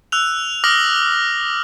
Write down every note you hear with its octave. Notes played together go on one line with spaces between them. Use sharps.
E6 F#6 F7
D6 D#6 F6 A#6 F#7